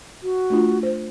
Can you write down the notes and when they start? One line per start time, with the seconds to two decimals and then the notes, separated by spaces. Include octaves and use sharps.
0.23 F#4
0.50 A3 D4 F4
0.83 C5